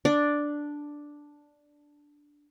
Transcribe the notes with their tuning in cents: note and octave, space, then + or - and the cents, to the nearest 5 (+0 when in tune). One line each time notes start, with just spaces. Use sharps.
D4 +0 D5 +0